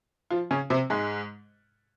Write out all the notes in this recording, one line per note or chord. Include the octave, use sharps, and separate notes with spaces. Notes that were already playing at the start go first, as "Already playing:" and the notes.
F3 F4
C#3 C#4
C3 C4
G#2 G#3